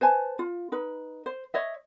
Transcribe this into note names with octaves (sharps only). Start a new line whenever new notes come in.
B4 C5 G#5 A5
F4
D#4 B4
C5
C#5 D#5 E5